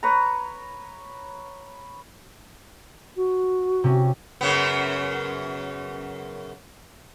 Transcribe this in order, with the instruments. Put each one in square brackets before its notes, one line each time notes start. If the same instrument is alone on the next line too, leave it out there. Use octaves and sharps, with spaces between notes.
[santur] B4 C#5 A#5
[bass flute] F#4
[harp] C3 C#4
[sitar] F#2 C#3 B3